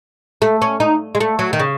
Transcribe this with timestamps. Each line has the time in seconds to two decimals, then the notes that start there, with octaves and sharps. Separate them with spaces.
0.42 A3
0.62 C#4
0.80 D#4
1.15 G#3
1.20 A3
1.39 F#3
1.53 D#3
1.59 C#3